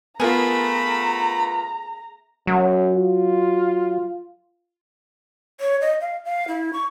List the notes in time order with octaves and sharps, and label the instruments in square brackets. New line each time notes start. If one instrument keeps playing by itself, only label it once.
[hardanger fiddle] A3 B5 [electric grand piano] B3 F4 [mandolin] G#4 A#4 [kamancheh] A#5
[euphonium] F#2 [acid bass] F#3
[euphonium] F4
[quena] C#5
D#5
F5
F5
E4
C#6